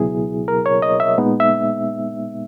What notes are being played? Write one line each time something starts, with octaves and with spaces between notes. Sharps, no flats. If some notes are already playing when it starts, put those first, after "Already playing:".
Already playing: C#2 B2 F#3 B3 E4 G#4
A#4
C#5
D#5
E5
A#2 G#3 B3 D#4
E5